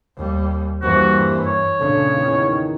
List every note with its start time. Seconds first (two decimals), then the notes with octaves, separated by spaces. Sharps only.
0.16 D#2 G3
0.82 G2 E3 G3 A#3 F#4 C5
1.46 C#5
1.80 A#2 C#3 C#4 D4 A4
2.15 E2 D#3